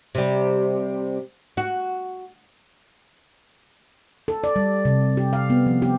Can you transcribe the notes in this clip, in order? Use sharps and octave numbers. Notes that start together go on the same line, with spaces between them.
C3 G3
F#4
A4
D5
G3
C3
G4
F5
B3
F3
G4